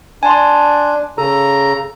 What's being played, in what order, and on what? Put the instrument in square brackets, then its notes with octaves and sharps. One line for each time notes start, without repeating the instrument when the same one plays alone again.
[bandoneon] D4 [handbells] G#5 A5 C6
[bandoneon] C#3 A#5 [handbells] A4